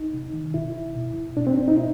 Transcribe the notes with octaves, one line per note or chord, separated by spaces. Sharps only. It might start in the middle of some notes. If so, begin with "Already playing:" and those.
Already playing: D#4
C3
D#3
B2 E4
B2
B2 D4
C4
D4
D#4
B2 E4